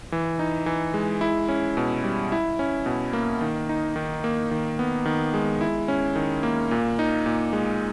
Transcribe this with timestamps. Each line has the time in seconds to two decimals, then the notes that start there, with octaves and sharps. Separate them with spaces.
0.12 E3
0.39 D#4
0.66 E3
0.94 G#3
1.21 E4
1.49 C#4
1.77 B2
2.04 G3
2.32 E4
2.59 C#4
2.86 B2
3.13 A#3
3.41 D#3
3.69 D#4
3.96 D#3
4.24 A#3
4.51 D#3
4.79 B3
5.06 D#3
5.34 G#3
5.61 E4
5.88 C#4
6.16 D#3
6.43 A#3
6.71 A#2
6.99 D#4
7.26 A#2
7.53 G#3